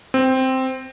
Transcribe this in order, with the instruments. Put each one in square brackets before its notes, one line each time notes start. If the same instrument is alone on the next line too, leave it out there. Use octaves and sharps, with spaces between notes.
[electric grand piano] C4